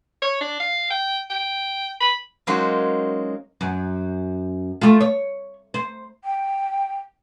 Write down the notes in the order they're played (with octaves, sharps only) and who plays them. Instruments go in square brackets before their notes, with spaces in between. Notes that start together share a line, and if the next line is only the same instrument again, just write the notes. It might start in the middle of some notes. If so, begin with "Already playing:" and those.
[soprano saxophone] C#5
D4
F5
G5
G5
B5
[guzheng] F#3 G#3 A#3 C#4 D#4 C5
[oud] F#2
A3 F4
C#5
C5
[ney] G5